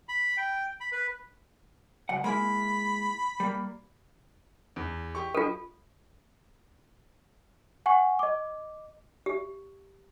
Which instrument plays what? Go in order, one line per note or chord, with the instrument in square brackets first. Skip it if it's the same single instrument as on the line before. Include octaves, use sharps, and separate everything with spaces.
[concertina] B5
G5
B5
B4
[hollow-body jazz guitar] C#2 F#2 F#5
[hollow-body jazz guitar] G#3 A#3 E4 [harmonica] B5
[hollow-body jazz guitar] G3 A#3
[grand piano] E2
G4 C#6
[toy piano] F4 A4
[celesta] F#5 G#5 C#6
D#5 D6
[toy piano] G4